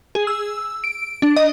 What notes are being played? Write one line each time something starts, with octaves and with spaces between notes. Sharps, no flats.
G#4
E6
D7
D4
D#5